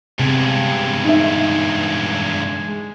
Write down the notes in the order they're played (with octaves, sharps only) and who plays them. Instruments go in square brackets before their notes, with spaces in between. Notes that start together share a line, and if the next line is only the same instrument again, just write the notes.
[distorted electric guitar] E2 G2 [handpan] C3 [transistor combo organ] G#3
[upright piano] D#4 E5